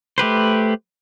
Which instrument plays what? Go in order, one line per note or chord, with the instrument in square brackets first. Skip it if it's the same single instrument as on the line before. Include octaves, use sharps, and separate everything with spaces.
[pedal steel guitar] A3 G4 B4 C5